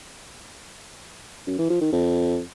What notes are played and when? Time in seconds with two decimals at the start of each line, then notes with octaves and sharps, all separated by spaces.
1.47 F#2
1.58 E3
1.70 F3
1.81 D#3
1.93 F2